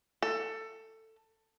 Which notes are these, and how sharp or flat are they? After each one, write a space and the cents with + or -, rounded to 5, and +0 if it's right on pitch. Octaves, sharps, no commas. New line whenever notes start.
A4 +15